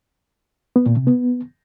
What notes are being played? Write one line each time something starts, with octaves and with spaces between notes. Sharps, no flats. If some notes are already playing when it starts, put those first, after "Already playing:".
B3
A#2
C3
B3